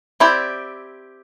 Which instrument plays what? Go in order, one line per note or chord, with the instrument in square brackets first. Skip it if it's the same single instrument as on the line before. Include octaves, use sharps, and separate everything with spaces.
[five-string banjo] C4 E4 G4 D5